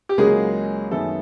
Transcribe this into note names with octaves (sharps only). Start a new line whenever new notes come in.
G4
C#2 C#3 F#3 G#3 A#3 G#4
F#2 D#3 G#3 A3 B3 A4